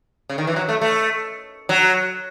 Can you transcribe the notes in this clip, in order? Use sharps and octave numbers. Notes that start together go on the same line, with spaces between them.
C#3
D#3
E3
F#3
A3
A3
F#3